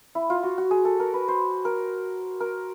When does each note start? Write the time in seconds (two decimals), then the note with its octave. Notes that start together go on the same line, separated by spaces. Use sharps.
0.15 E4
0.30 F4
0.43 F#4
0.58 F#4
0.71 G#4
0.85 A4
1.00 A#4
1.14 B4
1.28 C5
1.65 A#4
2.40 A#4